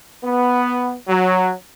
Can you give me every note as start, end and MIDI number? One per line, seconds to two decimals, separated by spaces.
0.24 0.93 59
1.08 1.51 54